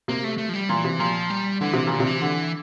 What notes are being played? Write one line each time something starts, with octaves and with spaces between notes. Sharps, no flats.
C3 A#3
A3
A3
F3
G3
A#2 E3
C3
A#2 F3
G3
D3 E3
C3
A#2 D3
C3
E3
D3